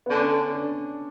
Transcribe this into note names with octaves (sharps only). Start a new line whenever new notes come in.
B3
D3 C#4
D4